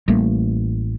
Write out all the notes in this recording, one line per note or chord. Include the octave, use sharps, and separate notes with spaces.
A1 G3 A3 A#3